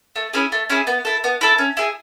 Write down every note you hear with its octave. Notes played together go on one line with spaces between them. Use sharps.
A3
C#4 E4 G#4
A3
C#4 E4 G#4
B3
E4 A4
B3
E4 A4
C#4
E4 G#4